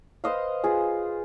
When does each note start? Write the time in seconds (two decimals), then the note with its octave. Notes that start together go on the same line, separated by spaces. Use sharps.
0.24 B4 C5 D#5 F5
0.64 F4 G#4